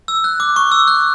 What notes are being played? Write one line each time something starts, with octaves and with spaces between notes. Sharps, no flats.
E6
F#6
D6
C#6
E6
F#6